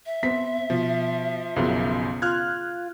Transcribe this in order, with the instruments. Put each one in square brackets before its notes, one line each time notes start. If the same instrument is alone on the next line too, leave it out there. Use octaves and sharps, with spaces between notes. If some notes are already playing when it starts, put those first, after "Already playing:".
[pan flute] E5
[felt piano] B3 C4 B6
[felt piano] B2 [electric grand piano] F3
[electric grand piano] B1 F#2 F3 [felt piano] C#3 B3
[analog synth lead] F4 [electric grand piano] F6 F#6 G#6